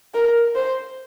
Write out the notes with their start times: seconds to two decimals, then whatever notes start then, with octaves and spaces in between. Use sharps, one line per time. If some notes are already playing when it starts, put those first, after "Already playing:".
0.14 A#4
0.55 C5